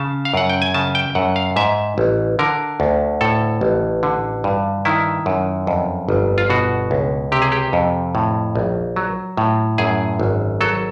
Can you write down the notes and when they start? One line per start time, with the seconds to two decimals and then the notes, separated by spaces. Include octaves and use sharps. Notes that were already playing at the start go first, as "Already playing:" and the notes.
Already playing: C#3 A5
0.25 F5
0.34 F#2 F#5
0.49 G5
0.62 G#5
0.74 C#3 A5
0.95 G5
1.15 F#2 F#5
1.36 F5
1.56 G#2 E5
1.98 A1
2.39 D3 A#4
2.80 D2
3.21 A2 A4
3.61 A1
4.03 D3
4.44 G2
4.85 D#3 E4
5.26 F#2
5.67 F2
6.09 G1
6.38 F4
6.50 B2 F#4
6.91 C#2
7.32 C3 G4
7.42 G#4
7.52 G4
7.73 F2
8.15 A2
8.56 A#1
8.96 F#3
9.37 A2
9.78 F#2 G#4
10.20 G#1
10.61 F#3 A4